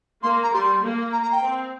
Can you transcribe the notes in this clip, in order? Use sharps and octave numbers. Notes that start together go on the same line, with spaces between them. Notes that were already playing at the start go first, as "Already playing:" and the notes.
A#3 C6
A#5
G3 C6
A#3
A#5
A#5
G5
C4